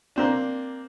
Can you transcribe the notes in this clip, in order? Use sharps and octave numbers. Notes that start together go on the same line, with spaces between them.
A#3 C4 D4